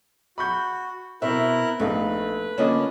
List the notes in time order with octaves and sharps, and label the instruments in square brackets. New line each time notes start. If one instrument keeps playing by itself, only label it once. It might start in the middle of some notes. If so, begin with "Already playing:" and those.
[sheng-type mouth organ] F#4 [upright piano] B5 C#6 G6
[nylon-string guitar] B2 [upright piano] C4 E5 [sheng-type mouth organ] E4 A#4 F#6
[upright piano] A#1 D#4 F5 [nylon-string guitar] A3 [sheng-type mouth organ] B4
[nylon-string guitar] D3 A#3 F4 [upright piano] C#4 D#5